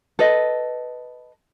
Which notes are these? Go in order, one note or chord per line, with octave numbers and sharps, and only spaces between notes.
A4 B4 D#5